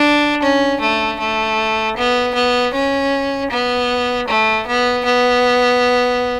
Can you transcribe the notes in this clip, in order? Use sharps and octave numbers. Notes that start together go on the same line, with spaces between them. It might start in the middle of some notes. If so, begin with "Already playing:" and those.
Already playing: D4
C#4
A3
A3
B3
B3
C#4
B3
A3
B3
B3